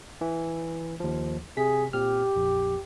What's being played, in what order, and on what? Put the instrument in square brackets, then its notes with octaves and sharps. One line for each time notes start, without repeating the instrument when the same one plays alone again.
[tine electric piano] E3
D#2 F3
[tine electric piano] C3 B6 [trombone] G#4
[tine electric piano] A#2 C4 F6 [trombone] G4
[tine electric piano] A#1 F2